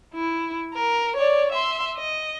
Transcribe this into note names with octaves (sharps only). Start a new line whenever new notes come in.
E4
A#4
C#5 D5
E5 C6
D#5